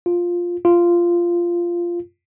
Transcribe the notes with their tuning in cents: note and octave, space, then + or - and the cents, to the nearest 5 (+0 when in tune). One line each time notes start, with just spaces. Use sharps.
F4 +5
F4 -10